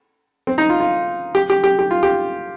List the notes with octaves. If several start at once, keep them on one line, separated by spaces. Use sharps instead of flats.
C4
D#4
F4
F4
G4
G4
G4
G4
F4
G4